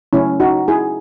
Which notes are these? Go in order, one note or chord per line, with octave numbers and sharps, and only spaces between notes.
C#3 F#3 A3 C#4 E4
D#4 F#4
E4 G#4